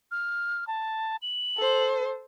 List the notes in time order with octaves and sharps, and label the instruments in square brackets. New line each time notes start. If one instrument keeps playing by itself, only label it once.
[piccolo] F6
A5
F#7
[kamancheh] A4 C5